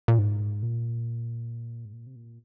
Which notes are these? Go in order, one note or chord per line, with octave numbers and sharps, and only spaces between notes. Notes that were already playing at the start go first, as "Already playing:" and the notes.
A#2
G#2
A#2
G#2
A#2
C3
A#2